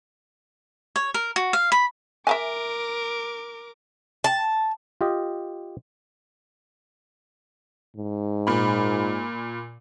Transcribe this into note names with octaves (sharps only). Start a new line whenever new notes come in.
C#5
A#4
F#4
F5
B5
A#4 E5 F5 G#5 D6
A5
F4 G4 D#5
G#2
A#2 B5